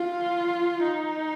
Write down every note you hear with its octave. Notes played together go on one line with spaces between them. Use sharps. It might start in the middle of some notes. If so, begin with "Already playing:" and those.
Already playing: F4
D#4